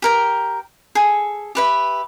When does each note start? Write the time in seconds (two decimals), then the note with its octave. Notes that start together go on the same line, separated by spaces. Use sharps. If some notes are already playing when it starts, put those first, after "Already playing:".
0.02 G4 A#4 G5
0.95 G#4 A4
1.55 G4 B4 E5